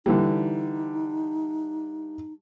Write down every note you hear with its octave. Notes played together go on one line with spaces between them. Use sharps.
D3 E3 G3 D#4